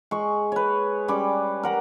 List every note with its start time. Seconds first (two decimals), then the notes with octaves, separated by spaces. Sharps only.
0.11 G#3 C#6
0.52 B4 C#5
1.08 G3 C#4 D6
1.63 A#4 F#5 B5